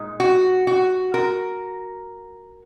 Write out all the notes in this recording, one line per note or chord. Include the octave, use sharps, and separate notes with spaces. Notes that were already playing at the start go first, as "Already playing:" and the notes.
Already playing: A#2 G#3 D#4
F#4
F#4
F#4 A#4